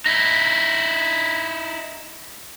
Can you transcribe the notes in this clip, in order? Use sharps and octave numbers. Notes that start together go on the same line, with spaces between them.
D#4 E4